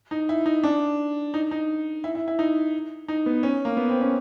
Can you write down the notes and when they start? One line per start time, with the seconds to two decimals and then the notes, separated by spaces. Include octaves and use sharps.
0.11 D#4
0.29 E4
0.46 D#4
0.63 D4
1.34 D#4
1.51 D#4
2.04 E4
2.15 E4
2.28 E4
2.39 D#4
3.08 D#4
3.26 B3
3.43 C#4
3.65 A#3
3.77 B3
3.89 C4
4.01 C#4